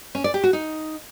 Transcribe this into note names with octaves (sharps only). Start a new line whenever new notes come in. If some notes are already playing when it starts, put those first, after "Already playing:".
C#4
D5
G4
F#4
D#4